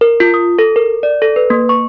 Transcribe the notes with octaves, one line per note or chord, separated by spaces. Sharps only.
A#4
F4
D#6
A4
A#4
D5
A4
B4
A#3
C#6